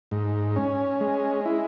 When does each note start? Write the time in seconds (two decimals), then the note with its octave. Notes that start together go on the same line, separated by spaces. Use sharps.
0.11 G#2
0.56 C#4
1.01 G#3
1.45 E4